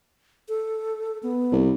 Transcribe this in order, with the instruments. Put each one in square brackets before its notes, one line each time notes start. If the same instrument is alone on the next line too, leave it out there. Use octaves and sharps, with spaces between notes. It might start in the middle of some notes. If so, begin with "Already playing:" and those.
[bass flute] A4
B3
[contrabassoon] C2